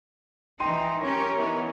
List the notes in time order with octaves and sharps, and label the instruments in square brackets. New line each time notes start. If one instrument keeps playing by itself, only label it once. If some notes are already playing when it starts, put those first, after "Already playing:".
[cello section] E3 D#4 [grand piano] G5 C6 D#7
[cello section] C#4 G4 [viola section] A#4 C#5 [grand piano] A#6
[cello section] E3 B3 D#4